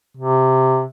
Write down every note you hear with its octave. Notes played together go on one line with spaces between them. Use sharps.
C3